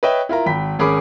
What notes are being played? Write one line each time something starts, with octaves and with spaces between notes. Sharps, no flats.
B4 C#5 D#5 E5 G5
E4 F4 A#4 A#5
G#1 G5 B5 B6
G#1 C#4 G#4 A#4 B5 D6